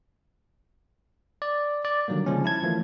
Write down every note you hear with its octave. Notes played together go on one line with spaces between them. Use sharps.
D5
D5
D3 D#3 F#3 G3 A#3
C#3 F3 G#3 C#4
E4 A5 G#6
E3 F3 A3 A#3